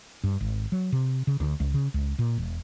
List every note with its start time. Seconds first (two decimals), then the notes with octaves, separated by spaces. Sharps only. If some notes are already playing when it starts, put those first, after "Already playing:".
0.24 G2
0.41 G#1
0.72 F#3
0.92 C3
1.27 C#3
1.40 D2
1.60 C#2
1.74 C#3
1.94 C#2
2.19 A#2
2.38 E1